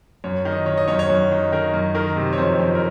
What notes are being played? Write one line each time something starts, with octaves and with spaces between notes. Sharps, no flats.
F#2 C#5
D#3
D#5
D#3 C#5
D#5
F#2 C#5
C#5
F#2
D#3
D#3 A#4
F#2
D#3 A#4
C3
C#5
F2 C5
F2
A#4